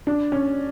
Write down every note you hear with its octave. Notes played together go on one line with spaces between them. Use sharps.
D4
C#4